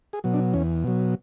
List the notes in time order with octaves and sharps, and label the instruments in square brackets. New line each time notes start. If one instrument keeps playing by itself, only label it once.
[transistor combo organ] G#4
B2 F#3
D4
E2 C#4
B2 F#3